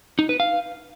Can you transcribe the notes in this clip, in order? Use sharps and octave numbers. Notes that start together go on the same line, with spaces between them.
D#4
B4
F5